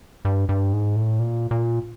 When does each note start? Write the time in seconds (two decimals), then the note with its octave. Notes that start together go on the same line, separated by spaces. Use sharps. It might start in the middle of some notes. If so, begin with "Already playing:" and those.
0.25 G2
0.49 G2
0.73 G#2
0.96 A2
1.20 A#2
1.51 A#2